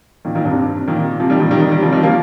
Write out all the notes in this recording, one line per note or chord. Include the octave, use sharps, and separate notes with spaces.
A#2 D#3
A#2 D#3
G2 C3
A#2 D#3
C3 F3
D#3 G3
A#2 D#3
D#3 G3
D#3 G3
D#3 G3
C3 F3
D#3 G3
F3 A#3